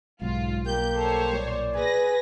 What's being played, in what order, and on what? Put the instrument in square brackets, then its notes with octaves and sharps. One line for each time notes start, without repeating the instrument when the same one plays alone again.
[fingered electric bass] B1 [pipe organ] G#2 [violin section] F4
[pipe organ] G3 A#3 G4 [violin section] G6
[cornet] A4 [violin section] C5 C#5
[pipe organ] A#2 [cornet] D5
[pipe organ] G#4 G#5 [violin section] B4 A#6